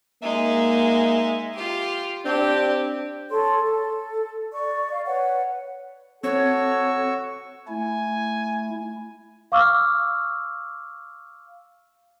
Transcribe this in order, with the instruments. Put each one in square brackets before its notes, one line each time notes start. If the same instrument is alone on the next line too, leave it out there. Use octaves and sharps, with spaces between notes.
[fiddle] G#3 D#4 [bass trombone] A#3 [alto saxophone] E5
[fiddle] F4 G4
[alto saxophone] C4 [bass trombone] D4 [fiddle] G4
[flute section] A4 C#5 C6
A4
D5 C#6
F5
B4 C#5 F#5
[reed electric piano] C4 [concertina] F#4 C#6 E6 [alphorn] A4 [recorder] C#5
[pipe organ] A3 E4 [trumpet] G#5
[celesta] F5 C#6 D6 E6 F6